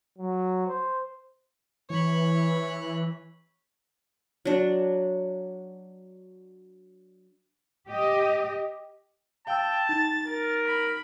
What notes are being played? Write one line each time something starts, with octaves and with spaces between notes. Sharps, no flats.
F#3
C5
E3 C#5 B5
F#3 D4
G4 D#5
F5 G5 A5 E6
D#4 A6
A#4
B5 B6